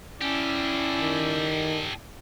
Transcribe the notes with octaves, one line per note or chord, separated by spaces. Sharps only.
C#4 E4 G4 A4 D5
D#3